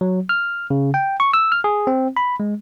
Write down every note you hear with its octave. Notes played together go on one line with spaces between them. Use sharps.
F#3
F6
C#3
G5
C#6
E6
F6
G#4
C4
B5
G#3